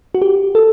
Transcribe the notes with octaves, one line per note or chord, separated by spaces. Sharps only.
F#4
G4
A4